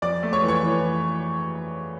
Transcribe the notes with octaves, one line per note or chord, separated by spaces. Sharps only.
F2 D5 D6
A3
C#5 C#6
E3
C#5 C#6
E3